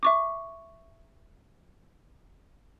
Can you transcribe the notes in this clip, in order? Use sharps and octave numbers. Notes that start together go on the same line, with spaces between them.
E5 C#6 D6